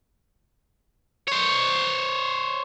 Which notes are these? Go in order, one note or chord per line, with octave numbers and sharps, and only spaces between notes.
C5 C#5